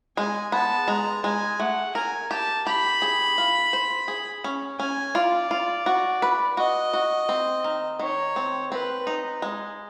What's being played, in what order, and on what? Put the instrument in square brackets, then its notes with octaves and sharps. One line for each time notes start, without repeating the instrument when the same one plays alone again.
[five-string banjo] G#3 [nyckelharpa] G#5
[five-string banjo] B3 [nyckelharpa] A5
[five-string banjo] G#3 [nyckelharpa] A#5
[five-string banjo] G#3 [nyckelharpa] G#5
[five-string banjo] A3 [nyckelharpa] F#5
[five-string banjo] A#4 [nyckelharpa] G#5
[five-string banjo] G4 [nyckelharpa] A5
[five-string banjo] G4 [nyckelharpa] B5
[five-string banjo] G#4
F4
C5
G#4
C#4
[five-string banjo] C#4 [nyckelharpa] G#5
[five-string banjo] F4 [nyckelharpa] D5
[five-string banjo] F4
F#4
B4
[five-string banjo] F#4 [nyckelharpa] D#5
[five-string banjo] F#4
C4
D#3
[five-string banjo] D#3 [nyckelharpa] C#5
[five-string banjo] C4
[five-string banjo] C4 [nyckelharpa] B4
[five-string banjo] D#4
G#3